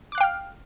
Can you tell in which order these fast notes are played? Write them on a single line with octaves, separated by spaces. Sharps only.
D6 F#6 F5 G5 F6